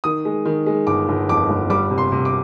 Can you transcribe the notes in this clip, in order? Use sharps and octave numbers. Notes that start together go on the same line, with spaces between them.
D#3 D#6
G#3
D#3
G#3
G1 D6
G1
F2 D6
G1
G3 D6
C3
C6
C3
D6